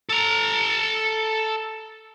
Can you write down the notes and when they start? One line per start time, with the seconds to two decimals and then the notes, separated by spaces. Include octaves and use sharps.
0.09 A4 A#5